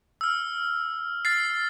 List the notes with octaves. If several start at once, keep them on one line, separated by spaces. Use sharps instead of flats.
E6 F6
F6 A6 C7